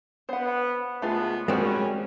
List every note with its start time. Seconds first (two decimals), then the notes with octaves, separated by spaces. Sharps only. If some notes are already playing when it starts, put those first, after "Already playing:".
0.29 B3 C5 F#5
1.02 C#2 A3 B3 F4 G#4
1.48 G3 G#3 C4 C#4 F#4 A#4